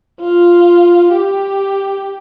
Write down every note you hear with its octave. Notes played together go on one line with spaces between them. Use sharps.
F4
G4